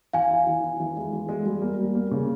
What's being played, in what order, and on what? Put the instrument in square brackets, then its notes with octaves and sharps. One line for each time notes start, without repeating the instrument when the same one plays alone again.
[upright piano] E3 [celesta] F5 G#5
[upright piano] E4
E3
E4
E3
G#3
E3
G#3
G3
A#3
G3
A#3
C#3